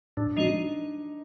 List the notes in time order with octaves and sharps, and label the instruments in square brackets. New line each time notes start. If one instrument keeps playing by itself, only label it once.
[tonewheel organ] A2 [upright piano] D4
[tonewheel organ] F3 G#3 C#4 F#4 [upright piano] D#4